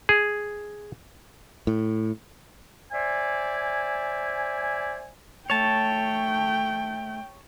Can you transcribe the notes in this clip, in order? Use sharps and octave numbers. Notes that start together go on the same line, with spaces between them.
G#4
A2
C5 D5 E5 G#5
A3 C#5 G5 A5